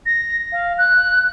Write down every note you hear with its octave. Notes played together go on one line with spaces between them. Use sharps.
A#6
F5
F#6